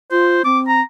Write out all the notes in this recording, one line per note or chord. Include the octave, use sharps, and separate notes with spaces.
F4 C5
C4 D6
A#5